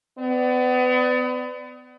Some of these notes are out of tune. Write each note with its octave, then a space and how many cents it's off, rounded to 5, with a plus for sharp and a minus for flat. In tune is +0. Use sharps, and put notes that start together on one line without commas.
B3 +35 D5 +5